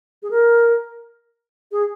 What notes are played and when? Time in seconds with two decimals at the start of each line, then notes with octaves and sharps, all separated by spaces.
0.23 G#4
0.31 A#4
1.72 G#4